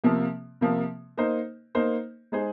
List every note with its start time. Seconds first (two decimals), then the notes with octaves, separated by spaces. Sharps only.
0.04 C3 F3 A#3
0.61 C3 F3 A#3
1.17 A#3 D#4 C5
1.75 A#3 D#4 C5
2.32 G#3 D#4 G#4 C5